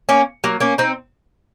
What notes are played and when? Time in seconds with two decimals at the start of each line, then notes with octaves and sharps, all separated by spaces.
0.09 A#3 C#4
0.44 F#3 A#3
0.60 A#3 C#4
0.78 C4 D#4